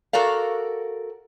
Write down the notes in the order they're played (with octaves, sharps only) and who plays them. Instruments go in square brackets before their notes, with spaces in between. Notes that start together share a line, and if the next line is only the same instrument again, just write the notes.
[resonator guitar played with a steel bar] F#4 A4 A#4 D5 F5